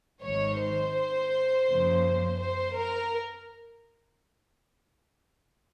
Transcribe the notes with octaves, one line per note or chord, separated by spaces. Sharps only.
G#1 G#2 D#3 C#5
C5
F#2 C#3 F3 A#3
C5
A#4